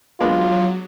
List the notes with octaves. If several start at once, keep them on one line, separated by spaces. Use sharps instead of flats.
F#3 G#3 B3 D4 F4